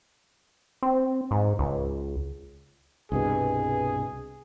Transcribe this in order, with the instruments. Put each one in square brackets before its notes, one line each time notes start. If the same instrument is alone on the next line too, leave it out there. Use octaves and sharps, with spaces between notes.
[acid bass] C4
G#2
C#2
[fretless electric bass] C2 G2 B2 [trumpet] G#4